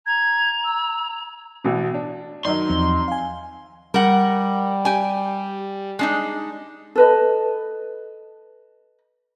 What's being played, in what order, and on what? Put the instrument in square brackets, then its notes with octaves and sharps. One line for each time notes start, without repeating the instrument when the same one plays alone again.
[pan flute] A#5 [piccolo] G#6
[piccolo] E6
[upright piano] A1 B2
D4
[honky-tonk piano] D#3 F#3 D#4 [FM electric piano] D5 [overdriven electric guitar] C6
[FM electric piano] E2 F3 C4
F5 G#5
[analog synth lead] G3 [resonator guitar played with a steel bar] A#4 F#5
[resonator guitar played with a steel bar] G4 G#5
G#3 D4 D#4
[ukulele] A4 B4 D#5